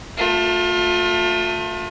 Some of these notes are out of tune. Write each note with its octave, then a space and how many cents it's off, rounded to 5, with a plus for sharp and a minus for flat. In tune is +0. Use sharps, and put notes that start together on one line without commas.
A3 +10 F4 +35